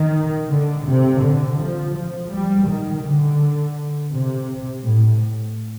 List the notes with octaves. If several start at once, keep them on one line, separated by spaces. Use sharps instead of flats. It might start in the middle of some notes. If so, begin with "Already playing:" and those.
Already playing: D#3
D3
C3
D3
F3
F3
G3
D#3
D3
C3
A2